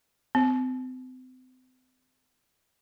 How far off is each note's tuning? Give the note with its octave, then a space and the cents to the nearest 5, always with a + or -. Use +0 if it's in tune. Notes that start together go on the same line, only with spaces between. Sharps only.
C4 -40